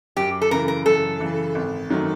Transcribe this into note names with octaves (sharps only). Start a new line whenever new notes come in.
F#2 G4
A4
C#3 E3 A#4
A#4
F#2 A4
C#3 E3
G#1
F#2 D#3 F#3 A3